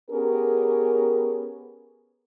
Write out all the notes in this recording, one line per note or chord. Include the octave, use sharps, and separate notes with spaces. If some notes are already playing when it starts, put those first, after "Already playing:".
B3 C#4 G4 G#4 A#4